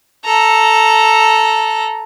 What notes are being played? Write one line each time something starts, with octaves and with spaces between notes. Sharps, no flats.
A4 A#5